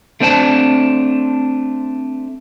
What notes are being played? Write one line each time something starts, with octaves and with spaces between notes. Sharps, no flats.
A3 C4 D4 C5 G#5 A5